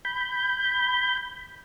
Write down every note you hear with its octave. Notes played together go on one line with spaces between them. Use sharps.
B5 G6